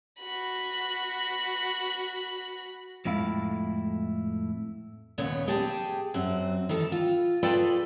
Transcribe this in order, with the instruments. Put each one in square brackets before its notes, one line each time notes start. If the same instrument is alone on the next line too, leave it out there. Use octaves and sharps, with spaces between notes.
[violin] F#4 B5
[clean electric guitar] F2 A2 G#3 E4 F5
[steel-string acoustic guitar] D#2 A#2 C#3 B3 C#5
G4 G#4 G5 A5
F#2 C4 F#4
D#3 E3 A4
F4
F4 G#4 A4 B4 D5 G5